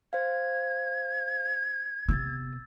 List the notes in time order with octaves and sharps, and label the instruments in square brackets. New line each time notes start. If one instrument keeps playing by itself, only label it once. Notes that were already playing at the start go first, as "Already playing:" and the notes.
[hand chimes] C5 F5 [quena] G#6
[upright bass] C3 B3 [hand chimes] E6 A6